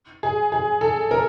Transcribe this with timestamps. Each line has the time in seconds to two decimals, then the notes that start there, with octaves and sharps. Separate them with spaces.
0.23 G#4
0.52 G#4
0.81 A4
1.11 A#4